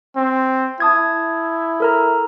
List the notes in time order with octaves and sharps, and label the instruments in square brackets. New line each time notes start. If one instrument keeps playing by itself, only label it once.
[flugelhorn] C4
[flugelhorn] E4 [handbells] A5 D#6 G#6
[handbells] A4 A#4 A#5